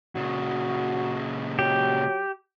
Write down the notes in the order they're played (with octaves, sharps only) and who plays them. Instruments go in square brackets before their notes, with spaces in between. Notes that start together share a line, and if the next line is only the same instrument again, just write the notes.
[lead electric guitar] A#2 C#3 [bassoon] F#4
[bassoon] F#3 [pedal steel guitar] G4